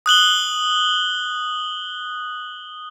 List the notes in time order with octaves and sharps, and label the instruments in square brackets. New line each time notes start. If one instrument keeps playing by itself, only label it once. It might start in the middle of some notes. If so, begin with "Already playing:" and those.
[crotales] D#6 F#6 F#7 G7